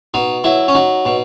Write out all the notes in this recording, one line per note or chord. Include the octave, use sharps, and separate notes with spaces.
B2 D#4
F#3 E4
C#4
F#3 D#4
B2